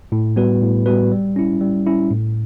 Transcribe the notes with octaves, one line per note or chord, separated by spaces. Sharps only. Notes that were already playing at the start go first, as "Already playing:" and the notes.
A2
G3 B3 F#4 B4
A2
G3 B3 F#4 B4
G3
C#4 E4
G3
C#4 E4
A2